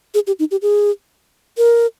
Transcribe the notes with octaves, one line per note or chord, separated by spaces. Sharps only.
G#4
G4
D#4
G4
G#4
A#4